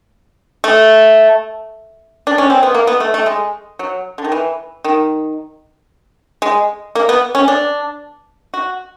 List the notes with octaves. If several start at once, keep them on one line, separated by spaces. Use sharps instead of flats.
A3
D4
C#4
C4
B3
A#3
B3
A3
A3
G#3
F#3
D3
D#3
E3
D#3
G#3
A#3
B3
C#4
D4
F#4